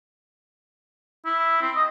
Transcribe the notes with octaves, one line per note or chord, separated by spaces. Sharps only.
E4
C4
D#5